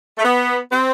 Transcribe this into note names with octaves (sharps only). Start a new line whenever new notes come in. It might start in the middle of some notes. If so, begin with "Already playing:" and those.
A3
B3
C4